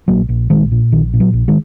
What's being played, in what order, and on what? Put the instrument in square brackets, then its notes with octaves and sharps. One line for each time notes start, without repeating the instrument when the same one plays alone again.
[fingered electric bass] A#1 F#3 A#3
A#1
A#1 D#3 G#3
A#2
A#1 D#3
A#2
F#3
A#1
D#3 G#3